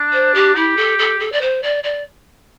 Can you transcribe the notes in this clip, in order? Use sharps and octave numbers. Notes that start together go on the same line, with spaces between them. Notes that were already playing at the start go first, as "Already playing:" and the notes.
Already playing: D4
C5
G4
E4 G4
A4
A4
A4
D5
C5
D5
D5